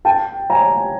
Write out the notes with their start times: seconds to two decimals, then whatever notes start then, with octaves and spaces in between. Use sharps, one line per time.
0.05 G5 A5
0.50 G#5 A#5